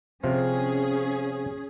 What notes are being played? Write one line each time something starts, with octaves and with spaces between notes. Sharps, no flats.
C3 F3 C#4 F4 G#4